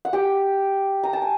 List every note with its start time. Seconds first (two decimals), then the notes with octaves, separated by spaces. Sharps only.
0.05 F#5
0.13 G4 G5
1.03 A#5
1.13 A5
1.22 G#5